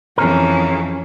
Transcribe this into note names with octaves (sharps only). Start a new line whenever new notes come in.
F2 E3 C#4 G#4 A#4